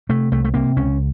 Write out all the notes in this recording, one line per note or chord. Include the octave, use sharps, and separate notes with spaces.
C3 A3
C2 A3
A3
C3 A#3
C#2 C#4